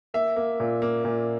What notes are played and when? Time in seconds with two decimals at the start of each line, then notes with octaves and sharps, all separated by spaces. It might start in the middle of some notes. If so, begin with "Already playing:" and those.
0.14 A#3 E5
0.36 A#3
0.60 A#2
0.82 A#3
1.05 A#2